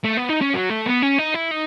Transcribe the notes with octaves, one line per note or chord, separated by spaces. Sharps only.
A3
B3
D#4
C#4
F#3
A3
B3
C#4
D#4
E4
D#4